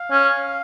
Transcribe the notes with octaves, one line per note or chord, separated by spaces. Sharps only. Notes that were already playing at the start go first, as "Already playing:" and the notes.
Already playing: F5
C#4